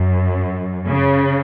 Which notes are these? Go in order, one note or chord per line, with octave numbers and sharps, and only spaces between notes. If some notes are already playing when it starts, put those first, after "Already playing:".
Already playing: F#2
C#3